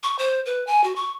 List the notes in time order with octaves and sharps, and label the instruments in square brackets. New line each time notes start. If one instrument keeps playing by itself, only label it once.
[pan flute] C#6
C5
B4
G#5
F#4
C#6